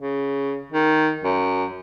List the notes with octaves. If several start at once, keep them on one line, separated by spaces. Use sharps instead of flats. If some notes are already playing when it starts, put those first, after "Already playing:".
C#3
D#3
F#2